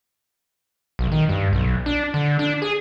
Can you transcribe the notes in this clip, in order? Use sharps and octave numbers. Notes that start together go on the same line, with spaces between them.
B1
D#3
G2
B1
D4
D3
D4
G#4